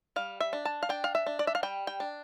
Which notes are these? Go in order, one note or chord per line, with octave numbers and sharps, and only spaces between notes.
G3 F5
E5
D4
A5
F5
D4 G5
F5
E5
D4
D5
E5
F5
G3 G5
G5
D4